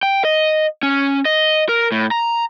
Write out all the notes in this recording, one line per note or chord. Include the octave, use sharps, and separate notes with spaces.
G5
D#5
C#4
D#5
A#4
A2
A#5